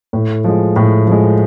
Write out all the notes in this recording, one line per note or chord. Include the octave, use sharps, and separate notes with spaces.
A2
F3 G#3
A2
F3 G#3